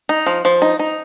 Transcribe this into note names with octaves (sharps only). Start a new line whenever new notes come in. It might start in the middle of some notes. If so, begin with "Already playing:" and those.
D#4
F3
F3
D#4
D#4